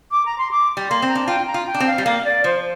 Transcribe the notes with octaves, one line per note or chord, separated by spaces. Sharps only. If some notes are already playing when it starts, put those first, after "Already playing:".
D6
A#5
C6
D6
G3
A#3 C6
C4
A#5
D4
F4 G5
A#5
F4
G5
D4
C4
F5
G3
A#3 F5
D5
F3 C5